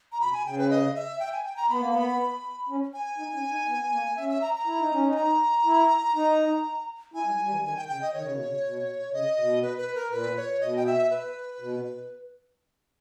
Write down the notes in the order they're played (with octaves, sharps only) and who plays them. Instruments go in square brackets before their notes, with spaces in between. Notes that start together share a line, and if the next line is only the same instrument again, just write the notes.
[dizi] A#5
[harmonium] B2 [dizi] B5
[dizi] G#5
[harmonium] C#3 [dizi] G5
[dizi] B4
D#5
E5
G5
G#5
G5
A#5
[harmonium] B3 [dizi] B5
[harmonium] A#3
B3
C#4
[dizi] G#5
[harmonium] D#4
C#4
D#4
B3
B3
A#3
[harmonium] C#4 [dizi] E5
[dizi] E5
A#5
A#5
[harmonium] E4
D#4
C#4
D#4
[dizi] G#5
A#5
[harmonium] E4
D#4
[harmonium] E4 [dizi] G#5
[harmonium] G3
G3
E3
[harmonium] D#3 [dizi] G#5
[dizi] G5
[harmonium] C#3 [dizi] G5
[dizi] D#5
[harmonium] D#3 [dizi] C#5
[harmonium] C#3
B2
C#3
B2
[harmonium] C#3 [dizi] D#5
[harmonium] B2
[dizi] B4
B4
A#4
[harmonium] A#2 [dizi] B4
[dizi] C#5
[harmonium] B2 [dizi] D#5
[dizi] G5
E5
B4
[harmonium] B2